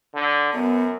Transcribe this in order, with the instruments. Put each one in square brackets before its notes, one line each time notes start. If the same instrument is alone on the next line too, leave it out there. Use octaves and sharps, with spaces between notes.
[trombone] D3
[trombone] F#2 [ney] B3